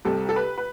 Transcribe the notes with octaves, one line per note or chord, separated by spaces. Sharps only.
C2 C3 G3 A4
A4
B4
B4